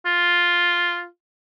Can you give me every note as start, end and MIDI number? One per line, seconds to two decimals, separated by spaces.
0.05 1.06 65